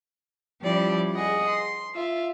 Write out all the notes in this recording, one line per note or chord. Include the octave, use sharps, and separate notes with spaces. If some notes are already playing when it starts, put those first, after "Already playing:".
F3 G3 C#4 E4 G4 D5
G#4 D#5 F#5 G#5
C6
F4 E5